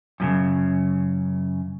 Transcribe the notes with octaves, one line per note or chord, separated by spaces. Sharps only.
F#2 A2 C#3